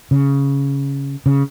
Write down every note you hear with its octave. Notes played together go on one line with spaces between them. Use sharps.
C#3
C#3